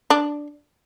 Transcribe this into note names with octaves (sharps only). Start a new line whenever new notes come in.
D4